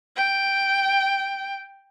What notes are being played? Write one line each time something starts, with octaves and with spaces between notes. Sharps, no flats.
G5